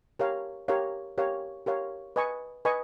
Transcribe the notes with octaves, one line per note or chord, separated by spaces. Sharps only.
G4 A#4 C#5 F5
G4 A#4 C#5 F5
G4 A#4 C#5 F5
G4 A#4 C#5 F5
B4 D#5 G#5 C#6
B4 D#5 G#5 C#6